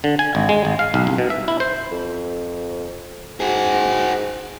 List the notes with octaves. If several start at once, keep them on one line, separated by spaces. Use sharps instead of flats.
D3
G#5
G#1
G#3
G#1
F5
B1
C2
B2
E5
E4
C5
F2
G#2 F#4 G#4